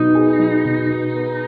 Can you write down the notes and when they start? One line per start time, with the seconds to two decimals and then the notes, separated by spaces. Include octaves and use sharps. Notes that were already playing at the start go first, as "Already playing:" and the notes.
Already playing: B2 F#3 B3 D#4
0.15 G#4
0.39 F#3
0.65 B2
0.91 B3
1.16 B3